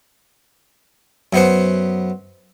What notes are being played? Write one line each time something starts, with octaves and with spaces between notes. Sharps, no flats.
F#2 B3 C5 F#5